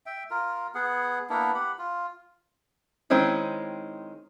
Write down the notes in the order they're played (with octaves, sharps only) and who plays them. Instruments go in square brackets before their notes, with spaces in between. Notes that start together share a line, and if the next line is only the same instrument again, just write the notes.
[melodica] E5 G5
F4 A#4
B3 G#4 F#5
A#3 B3 D4 E4
G4 F#5 B5
F4
[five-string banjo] D#3 G#3 C4 C#4 E4